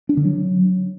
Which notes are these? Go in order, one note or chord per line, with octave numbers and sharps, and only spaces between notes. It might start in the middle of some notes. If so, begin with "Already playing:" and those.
D4
D3
F#3